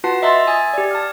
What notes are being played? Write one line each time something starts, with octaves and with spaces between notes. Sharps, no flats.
F4 F#4 B4 F#5 A5 C7
D#5 E5 A#5 C6 E6 A6
G#5 D#6 A6
G4 D5
A5 F6